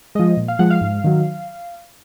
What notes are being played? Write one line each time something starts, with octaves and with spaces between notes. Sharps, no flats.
F3 G#3 D#5
A#2
F5
F3 G#3 F#5
F5
G#2
D#3 F#3